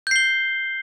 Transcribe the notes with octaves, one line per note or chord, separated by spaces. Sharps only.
G6 C7 G7